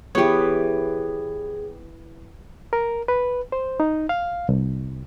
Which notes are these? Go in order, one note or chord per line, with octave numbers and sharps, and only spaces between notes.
E3 B3 G4 G#4 C#5
A#4
B4
C5
D#4
F5
C2